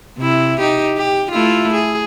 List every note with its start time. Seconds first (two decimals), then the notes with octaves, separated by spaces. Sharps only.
0.18 C3 E4
0.60 D#4 G4
0.97 G4
1.31 A3 E4 F4
1.73 G#4